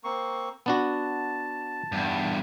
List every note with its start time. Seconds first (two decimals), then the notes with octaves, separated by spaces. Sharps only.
0.04 A#3 C4 C#6
0.66 B3 D4 F#4 A5
1.92 E2 G2